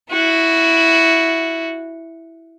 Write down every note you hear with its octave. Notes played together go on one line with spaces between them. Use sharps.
E4 F#4